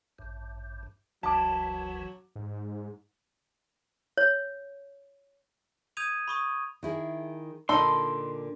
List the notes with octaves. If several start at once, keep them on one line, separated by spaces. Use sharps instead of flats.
A1 G2
F#1 D2 E3 F#3 A5 D6
G#2
C#5
D#6 G6 G#6 D#7 F7
B5 C#6 D#6
D#3 E4 G#4
A#2 D3 D#4 A4 B5 C6